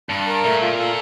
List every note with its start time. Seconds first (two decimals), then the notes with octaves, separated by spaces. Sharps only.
0.09 G2 A5
0.27 A#4
0.44 A#2 A3
0.61 F4
0.79 A4